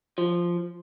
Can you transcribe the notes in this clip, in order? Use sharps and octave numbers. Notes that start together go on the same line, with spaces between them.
F3